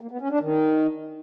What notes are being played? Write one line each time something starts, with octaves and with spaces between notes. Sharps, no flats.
A#3
B3
C#4
D4
D#3